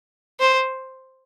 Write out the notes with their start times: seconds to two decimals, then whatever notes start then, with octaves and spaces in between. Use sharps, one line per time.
0.40 C5